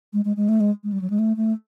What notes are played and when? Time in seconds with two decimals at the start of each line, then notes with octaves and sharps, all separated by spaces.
0.13 G#3
0.25 G#3
0.36 G#3
0.49 A3
0.60 G#3
0.84 G#3
0.92 G3
1.01 F#3
1.10 G#3
1.19 A3
1.36 A3